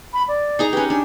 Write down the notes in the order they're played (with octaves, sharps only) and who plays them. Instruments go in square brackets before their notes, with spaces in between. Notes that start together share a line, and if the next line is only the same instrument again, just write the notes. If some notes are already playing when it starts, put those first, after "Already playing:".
[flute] B5
D5
[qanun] D#4 G#4 A#5
[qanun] C#4 G4 [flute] B4
[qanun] D4 [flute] G#5